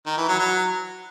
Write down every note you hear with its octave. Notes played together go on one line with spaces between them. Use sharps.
D#3
E3
F#3
F#3